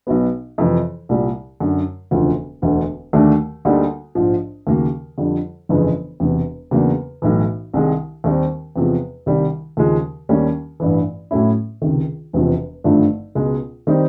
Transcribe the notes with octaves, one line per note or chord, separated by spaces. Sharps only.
B1 B2 F#3 B3
F2 C3 E3
C2 A#2 G3
F#2 D3 F#3
E1 D2 C#3 F3
E1 D2 D3
D#2 D3 F#3 A3 D4
D2 D3 G3 A#3 D#4
A#1 G#2 F3
D#2 C#3 F#3 A#3
F2 D3 G3
G1 F2 C#3 E3 G#3
E1 E2 C3
E2 C#3 F#3 A#3 D4
B1 A2 E3
C2 C3 D#3 G#3
D#2 D#3 G3 C4
E2 C3 F3 G#3
C2 C3 D#3 G3
D#2 C#3 F3 G#3
D#2 D#3 G3 A#3 C#4
A1 G2 E3
A2 F#3 A3 C#4 E4
C#2 C3 D#3
E1 E2 C3 F3
G#1 G2 D3 F3 A3
C#2 B2 G#3
D#3 G3 C4 D#4